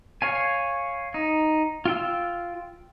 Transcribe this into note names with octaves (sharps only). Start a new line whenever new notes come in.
C#5 F5 G#5
D#4
F4 G5 E6